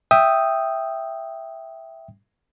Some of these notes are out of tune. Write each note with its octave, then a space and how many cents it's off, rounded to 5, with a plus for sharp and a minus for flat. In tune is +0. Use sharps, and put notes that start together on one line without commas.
E5 +0 G5 +0 D#6 +0